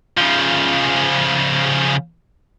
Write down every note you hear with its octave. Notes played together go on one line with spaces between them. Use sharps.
C#3 F3